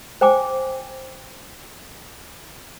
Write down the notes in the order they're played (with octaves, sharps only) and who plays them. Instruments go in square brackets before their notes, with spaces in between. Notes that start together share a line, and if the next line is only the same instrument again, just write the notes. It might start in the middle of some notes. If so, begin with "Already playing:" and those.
[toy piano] C5 G5 G#5 D6